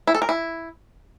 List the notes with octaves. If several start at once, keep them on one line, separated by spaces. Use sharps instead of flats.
E4
A4
A#4
E4